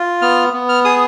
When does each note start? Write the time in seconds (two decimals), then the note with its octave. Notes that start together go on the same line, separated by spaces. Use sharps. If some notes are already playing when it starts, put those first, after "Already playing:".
Already playing: F4
0.22 B3 F6
0.53 B3
0.69 F6
0.84 G#4 D#6